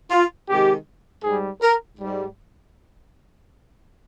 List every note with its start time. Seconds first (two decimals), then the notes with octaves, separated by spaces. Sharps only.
0.11 F4
0.48 C3 D#3 G#3 G4
1.23 G#2 G3 G#4
1.61 A#4
1.98 G#2 G3